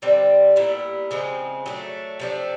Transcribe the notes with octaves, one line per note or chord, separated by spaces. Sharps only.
D3 G3 C4
A#2 G3 B3 E4
C#3 F3 G#3 C4
F#3 A3 D4
C3 F3 A3 D4